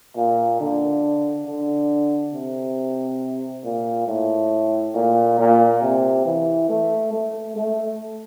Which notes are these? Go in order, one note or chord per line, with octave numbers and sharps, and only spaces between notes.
A#2
D3
D3
C3
A#2
A2
A#2
A#2
C3
E3
A3
A3
A3